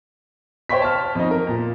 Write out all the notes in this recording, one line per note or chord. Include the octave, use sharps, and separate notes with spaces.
C5 C#5 G5 B5 C#6 B6
A5 F6
F2 D#4
A#4
A#2